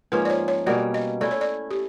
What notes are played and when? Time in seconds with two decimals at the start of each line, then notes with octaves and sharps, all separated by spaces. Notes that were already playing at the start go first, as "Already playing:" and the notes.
0.12 G#2 F3 A#3 C#4 B4
0.25 D5
0.30 C#5
0.48 C#5
0.66 B2 G3 A#3 C#4 D5
0.94 D#5
1.21 A3 C#4 E4 D5
1.31 C#5
1.41 D5
1.71 G4